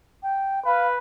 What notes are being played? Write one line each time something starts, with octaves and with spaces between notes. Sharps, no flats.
G5
B4 F5